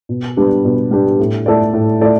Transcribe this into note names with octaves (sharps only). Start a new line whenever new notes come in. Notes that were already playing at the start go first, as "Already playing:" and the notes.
B2
G3 B3 D4 G4
B2
G3 B3 D4 G4
A2
A3 E4 A4 D5
A2
A3 E4 A4 D5